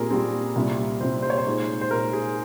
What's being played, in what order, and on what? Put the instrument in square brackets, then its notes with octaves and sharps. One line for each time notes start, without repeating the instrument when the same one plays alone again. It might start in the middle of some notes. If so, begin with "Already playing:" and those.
Already playing: [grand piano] A#2 G3 C4 [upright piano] G#4 A#4
[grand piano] A#2 G3 C4
C2 A#2 G3 C4
[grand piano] C2 A#2 G3 C4 [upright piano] C5
[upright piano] C5
C#5
C5
[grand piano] A#2 G#3 D#4
[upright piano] C5
[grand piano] A#2 G#3 D#4 [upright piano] A#4
[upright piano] G#4